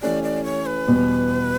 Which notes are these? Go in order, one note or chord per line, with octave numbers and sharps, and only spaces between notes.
E3 A3 C#4 G4 D5
D5
C#5
B4
E2 B2 G3 B3